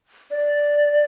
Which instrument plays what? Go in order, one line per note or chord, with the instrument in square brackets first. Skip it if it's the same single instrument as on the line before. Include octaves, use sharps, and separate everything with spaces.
[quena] D5